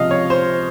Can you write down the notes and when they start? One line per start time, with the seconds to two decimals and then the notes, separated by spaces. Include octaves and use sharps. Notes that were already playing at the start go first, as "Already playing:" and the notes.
Already playing: C#2 C3 F3 D#5 F5
0.11 C#5
0.30 C5